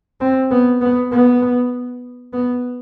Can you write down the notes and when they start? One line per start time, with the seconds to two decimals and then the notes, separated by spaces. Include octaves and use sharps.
0.21 C4
0.51 B3
0.81 B3
1.12 B3
2.33 B3